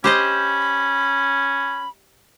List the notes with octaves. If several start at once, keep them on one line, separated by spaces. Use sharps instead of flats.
C#4 G4 C5 D#5 B5